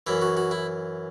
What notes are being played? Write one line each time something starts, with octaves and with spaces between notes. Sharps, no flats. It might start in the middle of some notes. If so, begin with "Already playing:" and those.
F#2 E3 E4
F#4
F#4
E4